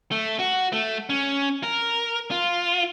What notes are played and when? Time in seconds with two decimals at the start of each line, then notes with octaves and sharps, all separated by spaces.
0.11 A3
0.39 F#4
0.73 A3
1.10 C#4
1.63 A#4
2.31 F4